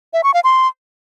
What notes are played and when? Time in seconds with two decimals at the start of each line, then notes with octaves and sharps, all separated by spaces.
0.13 E5
0.24 C#6
0.34 F5
0.44 C6